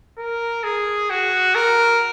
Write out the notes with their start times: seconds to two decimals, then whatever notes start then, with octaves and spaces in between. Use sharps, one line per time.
0.18 A#4
0.63 G#4
1.10 F#4
1.55 A#4